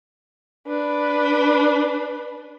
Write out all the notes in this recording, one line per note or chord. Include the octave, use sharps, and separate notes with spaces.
D4 B4